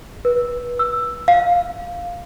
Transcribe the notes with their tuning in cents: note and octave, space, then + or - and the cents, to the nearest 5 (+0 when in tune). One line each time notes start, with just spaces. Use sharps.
B4 -25
E6 +10
F5 +5